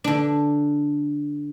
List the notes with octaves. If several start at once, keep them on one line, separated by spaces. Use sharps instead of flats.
D3 D4